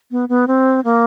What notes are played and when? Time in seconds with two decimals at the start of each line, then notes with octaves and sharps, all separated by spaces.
0.11 B3
0.29 B3
0.48 C4
0.84 A#3